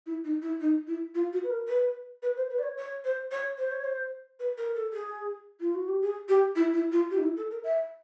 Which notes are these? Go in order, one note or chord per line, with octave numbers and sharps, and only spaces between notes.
E4
D#4
E4
D#4
E4
F4
F#4
B4
A#4
B4
B4
C5
B4
D5
C#5
C#5
C5
C#5
C5
C#5
C5
B4
A#4
A4
G#4
F4
F#4
G4
G#4
G4
E4
E4
F4
G4
D#4
E4
A4
A#4
E5